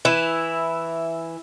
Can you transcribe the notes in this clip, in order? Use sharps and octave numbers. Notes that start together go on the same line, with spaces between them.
E3 E4